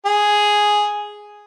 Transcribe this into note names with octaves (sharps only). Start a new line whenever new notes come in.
G#4